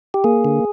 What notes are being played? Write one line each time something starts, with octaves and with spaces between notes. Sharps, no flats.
G4
A#3 G#4
D3